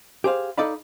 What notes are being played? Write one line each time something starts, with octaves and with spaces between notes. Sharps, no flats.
G4 G#4 C5 F5
D#4 A4 D5 D#5 F5 B5